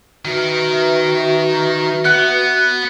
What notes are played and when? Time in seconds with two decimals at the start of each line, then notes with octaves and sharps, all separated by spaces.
0.25 D#3 F#4 A#4 B4 E5
2.05 B3 F#5